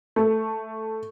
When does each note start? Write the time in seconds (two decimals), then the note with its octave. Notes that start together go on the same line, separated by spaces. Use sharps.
0.16 A3